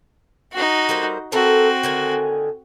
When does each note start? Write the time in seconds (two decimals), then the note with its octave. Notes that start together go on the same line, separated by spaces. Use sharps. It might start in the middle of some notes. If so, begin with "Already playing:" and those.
0.52 D#4 F#4
0.89 G3 A#3 C5
1.32 C4 F#4 A4 A#4 E5
1.83 D3 D#3 G#5